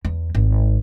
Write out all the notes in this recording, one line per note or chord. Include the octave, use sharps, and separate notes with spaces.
E2
G#1